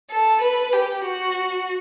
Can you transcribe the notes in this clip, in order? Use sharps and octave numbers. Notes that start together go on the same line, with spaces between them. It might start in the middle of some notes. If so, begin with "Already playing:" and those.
A4
B4
G4
F#4